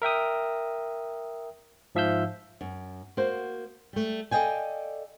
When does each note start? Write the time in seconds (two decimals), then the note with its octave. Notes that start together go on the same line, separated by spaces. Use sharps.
0.02 A#4 E5 G5 D#6
1.95 G#2 F3 E5 F5 E6 G6
2.61 F#2
3.17 A#3 F#4 C5
3.93 G3 A3
4.31 A4 D5 D#5 F5 G5 G#5